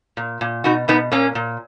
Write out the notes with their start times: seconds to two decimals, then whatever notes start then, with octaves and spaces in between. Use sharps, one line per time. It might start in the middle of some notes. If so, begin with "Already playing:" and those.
0.17 A#2
0.41 A#2
0.64 B2 D#4 F#4
0.88 B2 B3 D#4
1.12 A#2 A#3 C#4
1.35 A#2